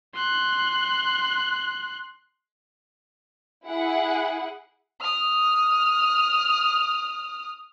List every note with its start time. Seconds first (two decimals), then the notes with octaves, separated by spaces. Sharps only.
0.15 C6 F#6
3.68 E4 G#4 F#5
5.01 D#6 F6